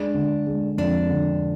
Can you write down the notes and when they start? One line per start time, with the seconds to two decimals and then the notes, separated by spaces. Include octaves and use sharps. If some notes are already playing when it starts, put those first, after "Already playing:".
Already playing: G#3 D4
0.14 D3
0.46 G#3
0.78 F2 D4
1.10 D3